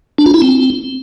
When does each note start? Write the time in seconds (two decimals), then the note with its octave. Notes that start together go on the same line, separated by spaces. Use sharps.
0.18 D4
0.26 F4
0.34 E4
0.42 C4